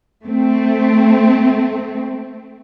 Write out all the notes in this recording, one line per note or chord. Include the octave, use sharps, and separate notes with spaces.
A3 C4